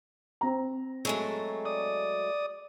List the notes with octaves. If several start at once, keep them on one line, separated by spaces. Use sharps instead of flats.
C4 A#5
F#3 G#3 A3
D5 D#6